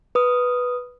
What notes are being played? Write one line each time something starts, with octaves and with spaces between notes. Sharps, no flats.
B4 D#6